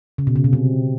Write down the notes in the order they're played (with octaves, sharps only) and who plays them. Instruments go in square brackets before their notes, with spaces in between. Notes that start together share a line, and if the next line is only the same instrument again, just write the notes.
[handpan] C#3
B2
C#3
B2
C3